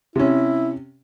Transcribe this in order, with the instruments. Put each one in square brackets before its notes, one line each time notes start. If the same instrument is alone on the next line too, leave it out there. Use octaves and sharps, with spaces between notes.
[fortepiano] C3 C#4 [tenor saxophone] E4